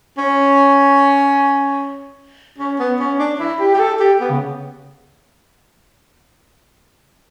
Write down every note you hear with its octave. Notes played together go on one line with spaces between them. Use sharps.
C#4
C#4
B3
C#4
D4
E4
G4
G4
A4
G4
B3
C#3